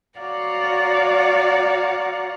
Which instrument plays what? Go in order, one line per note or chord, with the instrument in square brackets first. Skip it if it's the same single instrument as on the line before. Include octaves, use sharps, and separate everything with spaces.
[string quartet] F#4 C#5 D5 F5 F#5 A#5